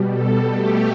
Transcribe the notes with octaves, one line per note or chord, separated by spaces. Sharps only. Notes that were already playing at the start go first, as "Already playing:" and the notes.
Already playing: B2 G3
A4
B2 A3 G4